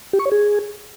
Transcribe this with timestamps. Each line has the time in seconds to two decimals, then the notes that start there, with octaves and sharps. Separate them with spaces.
0.13 G4
0.19 C#6
0.25 C#5
0.32 G#4